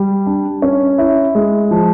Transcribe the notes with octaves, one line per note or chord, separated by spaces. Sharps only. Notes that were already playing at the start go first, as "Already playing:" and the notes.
Already playing: G3
D4
C#4
E4
G#3
F3